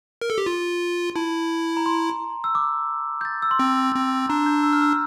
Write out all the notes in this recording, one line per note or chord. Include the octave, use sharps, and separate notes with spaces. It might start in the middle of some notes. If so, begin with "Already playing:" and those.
A#4
A4
G4
F4
E4 A5
A#5
C6
E6
D6
G6
A6
E6
C6
C4
C4
D4 A#5
G6
E6
F6
E6